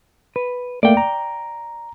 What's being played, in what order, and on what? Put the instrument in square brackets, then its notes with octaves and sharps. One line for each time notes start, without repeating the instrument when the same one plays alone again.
[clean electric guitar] B4
[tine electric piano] A3 A#3 [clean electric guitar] D5 G5
[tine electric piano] A#5